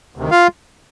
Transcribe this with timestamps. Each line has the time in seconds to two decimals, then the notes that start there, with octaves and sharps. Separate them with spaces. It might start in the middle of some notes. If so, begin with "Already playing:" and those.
0.16 D2 C3 D#3
0.31 F4 F5